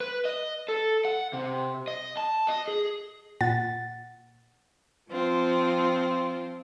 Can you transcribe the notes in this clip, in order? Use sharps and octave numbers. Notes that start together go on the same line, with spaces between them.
B4
D#5
A4
F#5
C3
D#5
A5
D#5
G#4
A#2 F#5 A6
F3 C4 F4